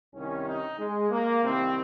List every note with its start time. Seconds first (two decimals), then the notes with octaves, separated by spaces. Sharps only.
0.14 C2 C3 D#3 C#4
0.46 D#4
0.79 G#3
1.10 A#3
1.42 C2 C3 D#3 C4